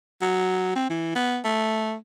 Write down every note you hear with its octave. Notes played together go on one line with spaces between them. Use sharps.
F#3
C4
E3
B3
A3